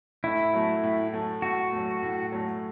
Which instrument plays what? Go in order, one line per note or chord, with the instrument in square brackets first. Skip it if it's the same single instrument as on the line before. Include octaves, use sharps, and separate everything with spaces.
[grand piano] A2 [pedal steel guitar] E4
[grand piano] F#3 A3
A2
F#3 A3
[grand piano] A2 [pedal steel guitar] F#4
[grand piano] F#3 A3
A2
F#3 A3